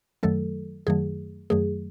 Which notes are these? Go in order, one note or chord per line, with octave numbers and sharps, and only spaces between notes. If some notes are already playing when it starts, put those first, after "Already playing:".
F#2 D#3 F#3 A3 A4
F#2 D#3 F#3 A3 G#4
F#2 D#3 F#3 A3 G#4